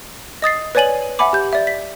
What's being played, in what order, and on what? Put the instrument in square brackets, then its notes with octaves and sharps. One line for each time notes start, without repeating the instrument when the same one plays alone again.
[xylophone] D#5 D#6 A6 C7
B4 C#5 D5 G#5 D#7 F#7
E5 F#5 G#5 B5 D6
G4 G6
D5 E5
B6